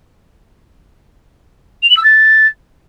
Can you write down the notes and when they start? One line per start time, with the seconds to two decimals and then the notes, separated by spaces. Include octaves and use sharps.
1.82 F7
1.89 F#7
1.96 E6
2.04 A6